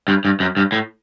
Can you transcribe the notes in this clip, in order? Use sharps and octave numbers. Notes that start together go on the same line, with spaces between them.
G2
G2
F#2
G2
A2